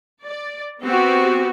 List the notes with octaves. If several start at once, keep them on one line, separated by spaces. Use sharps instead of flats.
D5
B3 C4 F#4 G4